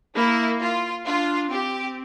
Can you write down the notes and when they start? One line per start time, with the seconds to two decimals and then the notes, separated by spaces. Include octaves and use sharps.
0.15 A#3 E4
0.60 F4
1.06 D4 F4
1.51 C4 G4